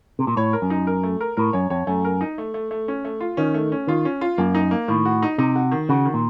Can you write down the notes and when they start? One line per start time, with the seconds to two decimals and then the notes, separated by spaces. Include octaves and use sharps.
0.19 C3
0.27 A#2
0.37 A2 C#5
0.53 A#4
0.62 F#2
0.70 D#4
0.87 A#4
1.03 A3
1.21 A#4
1.37 A2 A#4
1.53 F#2 C#5
1.70 F2 C#5
1.87 F#2 A3
2.05 A#4
2.21 D#4
2.38 A3
2.54 A3
2.71 A3
2.88 C#4
3.05 A3
3.21 F4
3.37 D#3 C#4
3.54 A3
3.72 C#4
3.87 D#3 F4
4.05 C#4
4.21 F4
4.38 F#2 A#3
4.55 D#4
4.71 A#3
4.88 A2 D#3
5.05 F#4
5.22 D#4
5.38 C3 D#4
5.55 F#4
5.71 D#3
5.89 C#3 F#4
6.05 D#3
6.14 A#2